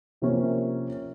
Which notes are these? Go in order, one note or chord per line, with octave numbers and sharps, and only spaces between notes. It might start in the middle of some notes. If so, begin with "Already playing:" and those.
C3 F3 A#3 C#4